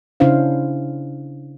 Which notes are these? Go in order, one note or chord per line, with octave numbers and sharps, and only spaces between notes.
C#3 C#4 D4 E4 C5 F5